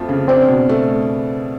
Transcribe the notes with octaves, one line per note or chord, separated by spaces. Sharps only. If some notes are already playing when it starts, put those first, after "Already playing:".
Already playing: F2 F3 A3 C4
C#3
C4 D4
B2
A3